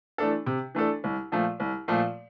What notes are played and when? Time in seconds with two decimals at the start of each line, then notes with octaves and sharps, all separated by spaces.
0.18 E3 A3 D4 A4
0.46 C3
0.75 E3 A3 D4 A4
1.04 C2
1.32 A#2 F3 A3
1.60 C2
1.88 A#2 F3 A3